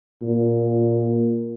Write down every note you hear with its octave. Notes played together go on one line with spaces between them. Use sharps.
A#2